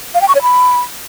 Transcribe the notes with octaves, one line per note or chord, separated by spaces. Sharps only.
F5
G5
C#6
C#5
B5